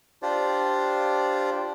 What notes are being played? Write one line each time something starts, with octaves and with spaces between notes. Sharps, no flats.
D4 F4 G4 C5 D5